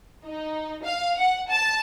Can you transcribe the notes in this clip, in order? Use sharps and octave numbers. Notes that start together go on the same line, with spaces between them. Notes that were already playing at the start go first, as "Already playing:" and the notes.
D#4
F5
F#5
A5